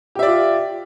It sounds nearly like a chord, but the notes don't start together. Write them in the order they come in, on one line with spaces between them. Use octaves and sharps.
G4 E5 D5 F4